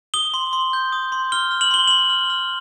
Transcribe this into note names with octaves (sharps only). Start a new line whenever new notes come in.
D#6 G7
C6
C6
G6
D#6
C6
F6 G7
F6
F#7
C6 G7
C6 F#7
F6
F6